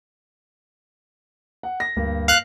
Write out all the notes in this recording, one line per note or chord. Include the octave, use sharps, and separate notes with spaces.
F#5
A#6
D2 G2 A#3
F5 F#6